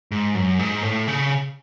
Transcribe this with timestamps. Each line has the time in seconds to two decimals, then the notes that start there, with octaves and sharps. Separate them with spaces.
0.11 G#2
0.35 F#2
0.59 G#2
0.83 A2
1.07 C#3